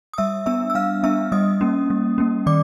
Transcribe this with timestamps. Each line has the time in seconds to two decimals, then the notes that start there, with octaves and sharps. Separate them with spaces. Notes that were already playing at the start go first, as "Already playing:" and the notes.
0.13 D#6
0.18 G3 E5 E6
0.46 B3 D4 E5 E6
0.70 E6
0.75 G3 F5 F6
1.03 B3 D4 E5 E6
1.32 G3 D#5 D#6
1.61 A#3 C#4
1.90 G3
2.18 A#3 C#4
2.46 D#3 D5 D6